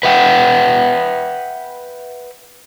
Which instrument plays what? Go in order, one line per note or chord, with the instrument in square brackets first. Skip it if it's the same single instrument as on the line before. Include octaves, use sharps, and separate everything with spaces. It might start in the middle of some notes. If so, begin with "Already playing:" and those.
[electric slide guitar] B4 E5 F#5 G5